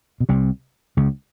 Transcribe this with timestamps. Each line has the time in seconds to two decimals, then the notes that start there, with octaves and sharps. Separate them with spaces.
0.20 B2
0.29 C2 C3
0.97 C#2 C#3